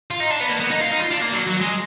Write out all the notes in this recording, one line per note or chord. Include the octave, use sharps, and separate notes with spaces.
F4
D#4
D4
B3
A#3
B3
D#4
F4
D#4
F4
D4
A#3
F#3
F#3
G#3